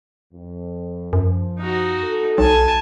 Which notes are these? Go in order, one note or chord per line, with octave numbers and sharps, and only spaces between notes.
F2
F#2 F3
D#4 F#4
A4
B1 G#5 A5